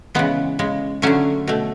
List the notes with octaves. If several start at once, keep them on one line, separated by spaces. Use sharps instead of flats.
C#3 E3 G#3 B3
C#3 G#3
D3 F#3 A3 C#4
B2 A3